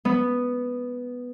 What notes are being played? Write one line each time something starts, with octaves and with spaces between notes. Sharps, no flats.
B3